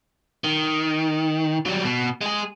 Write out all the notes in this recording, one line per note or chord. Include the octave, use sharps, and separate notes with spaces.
D#3
F#3 G3
B2
G#3 G#4